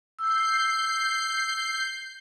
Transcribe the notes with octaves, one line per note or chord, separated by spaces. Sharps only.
E6 G6 C7